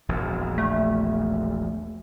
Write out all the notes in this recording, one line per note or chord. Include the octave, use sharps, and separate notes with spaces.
E1 A#1 E2
A3